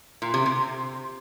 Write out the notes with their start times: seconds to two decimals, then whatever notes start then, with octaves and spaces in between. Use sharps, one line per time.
0.22 A#2
0.34 C3
0.46 C3